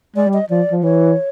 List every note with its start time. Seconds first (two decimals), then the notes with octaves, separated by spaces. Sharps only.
0.16 G#3 D5
0.27 G3
0.33 D#5
0.50 F3 D5
0.72 F3
0.83 E3 C#5